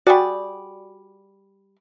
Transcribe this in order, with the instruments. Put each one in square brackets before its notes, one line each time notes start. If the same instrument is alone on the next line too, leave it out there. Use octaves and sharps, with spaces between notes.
[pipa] G3 G#4 D5 [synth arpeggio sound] F#4